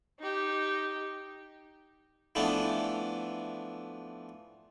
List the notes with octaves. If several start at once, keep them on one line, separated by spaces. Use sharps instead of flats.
D#4 G4
E3 F3 A3 B3 D4